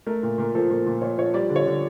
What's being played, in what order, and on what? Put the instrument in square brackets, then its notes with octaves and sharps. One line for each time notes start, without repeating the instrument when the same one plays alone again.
[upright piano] A3 A#4
A#2 A#4
A#2 A#4
F3 A4
A#2 A#4
A#2
A#2 C#5
F3 C#5
G3 D5
D3
C#5
D3